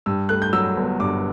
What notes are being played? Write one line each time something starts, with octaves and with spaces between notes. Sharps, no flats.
G2 E6
A3 F#6
G6
F#3 E6
G1
G2 D6